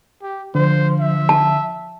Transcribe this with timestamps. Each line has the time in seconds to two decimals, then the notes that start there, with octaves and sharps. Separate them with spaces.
0.22 G4
0.55 D3 F3 C5
1.00 E5
1.29 A5